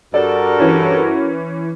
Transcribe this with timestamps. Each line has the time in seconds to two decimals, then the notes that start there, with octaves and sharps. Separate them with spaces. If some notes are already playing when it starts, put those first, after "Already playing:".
0.14 G2 F#4 A4 A#4 D5
0.60 E3 C#4